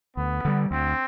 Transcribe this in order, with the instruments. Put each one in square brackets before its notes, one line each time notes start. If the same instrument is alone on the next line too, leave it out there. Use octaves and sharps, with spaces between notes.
[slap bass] D2 [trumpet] B3
[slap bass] D3 G3
[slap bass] D2 [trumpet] C4